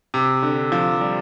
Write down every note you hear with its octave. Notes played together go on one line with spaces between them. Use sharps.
C3
D3
F3
G3